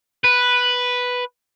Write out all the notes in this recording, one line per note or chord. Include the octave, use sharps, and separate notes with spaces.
B4